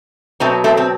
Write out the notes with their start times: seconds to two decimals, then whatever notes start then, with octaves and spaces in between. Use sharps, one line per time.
0.40 B2 F#3 A3 C4
0.64 A3 C4
0.77 C4